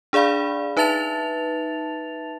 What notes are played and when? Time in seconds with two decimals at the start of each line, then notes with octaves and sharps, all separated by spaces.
0.13 D4 G#4 D5 F5 B5
0.77 D#4 B4 E5 A5 A6 F7